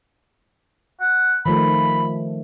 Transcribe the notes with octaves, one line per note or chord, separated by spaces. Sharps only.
F#5
D#3 F3 A3 B5